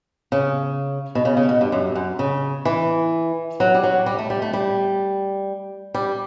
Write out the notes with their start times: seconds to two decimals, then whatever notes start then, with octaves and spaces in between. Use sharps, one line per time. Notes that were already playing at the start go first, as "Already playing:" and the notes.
0.32 C#3
1.15 B2
1.25 C#3
1.37 C#3
1.49 B2
1.61 G2
1.72 F#2
1.95 F#2
2.19 C#3
2.65 E3
3.60 F#3
3.74 G3
3.83 F#3
4.06 G3
4.19 A3
4.30 G3
4.42 A3
4.53 G3
5.94 G3